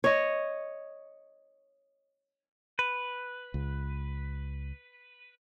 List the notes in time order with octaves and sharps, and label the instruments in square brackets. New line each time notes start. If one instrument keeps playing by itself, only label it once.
[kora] C#5 D#5
[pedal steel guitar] B4
[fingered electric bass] C#2